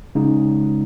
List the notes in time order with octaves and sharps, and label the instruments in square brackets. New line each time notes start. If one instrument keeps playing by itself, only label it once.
[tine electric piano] C#3 G#3 D#4